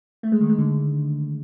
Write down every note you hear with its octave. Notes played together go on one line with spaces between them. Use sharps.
A3
G#3
D#3
G#3
D3